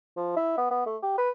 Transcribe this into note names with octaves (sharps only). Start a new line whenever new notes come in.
F3
E4
B3
B3
A3
G4
B4